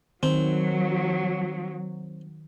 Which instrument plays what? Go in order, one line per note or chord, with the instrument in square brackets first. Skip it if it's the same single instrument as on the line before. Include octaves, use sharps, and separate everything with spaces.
[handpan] D#3 [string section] F#3 [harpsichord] C4